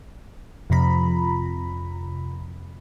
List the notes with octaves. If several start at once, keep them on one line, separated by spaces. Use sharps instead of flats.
F2 C3 F3 A#5 B5